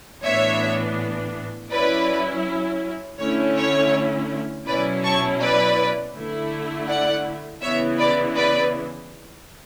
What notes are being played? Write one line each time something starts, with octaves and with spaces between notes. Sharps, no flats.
A2 E3 B3 D4 C#5 E5
F#3 C#4 E4 B4 D5
D3 A3 C#4 E4 C#5
C#5
B2 F#3 C#4 E4 B4 D5
A5 C#6
B4 D5
D3 A3 E4
D5 F#5
C#3 E3 B3 E4 C#5 E5
B4 D5
B4 D5